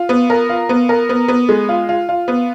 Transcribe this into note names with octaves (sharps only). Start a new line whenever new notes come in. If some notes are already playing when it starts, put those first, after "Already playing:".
Already playing: F4
B3
A#4
F4
B3
A#4
B3
B3
G#3
F4
F4
F4
B3